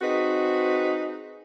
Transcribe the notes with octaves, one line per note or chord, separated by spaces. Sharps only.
C4 D#4 F#4 G#4 B4